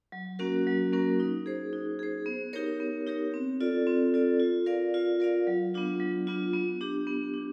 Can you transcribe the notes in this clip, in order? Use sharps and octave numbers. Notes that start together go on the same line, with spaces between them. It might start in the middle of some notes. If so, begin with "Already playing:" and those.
F#3
A#3 C#4 F#4 A#4
F#3
A#3 C#4 F#4 A#4
D#4
G#4 C5
D#4
G#4 C5
B3
D#4 G4 A#4 C#5
B3
D#4 G4 A#4 C#5
C4
F4 A4 D5
C4
F4 A4 D5
F4
A#4 D5 F5
F4
A#4 D5 F5
F#3
B3 D4 F4
F#3
B3 D4 F4
B3
D4 G4
B3
D4